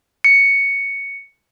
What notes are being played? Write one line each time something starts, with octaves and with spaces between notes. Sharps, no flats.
C#7